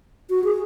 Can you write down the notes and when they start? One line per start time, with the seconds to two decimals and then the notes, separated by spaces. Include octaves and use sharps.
0.30 F#4
0.44 G#4